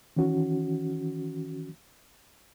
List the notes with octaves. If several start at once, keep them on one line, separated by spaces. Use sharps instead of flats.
D#3 E3 C#4 F#4